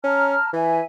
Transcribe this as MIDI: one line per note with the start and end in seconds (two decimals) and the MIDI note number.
0.04 0.36 61
0.04 0.48 81
0.04 0.48 82
0.04 0.48 89
0.53 0.81 52
0.53 0.82 76
0.53 0.82 80